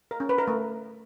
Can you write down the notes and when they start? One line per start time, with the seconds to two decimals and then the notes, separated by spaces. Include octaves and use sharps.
0.11 A#4
0.20 C#4
0.29 B4
0.38 A#4
0.48 A3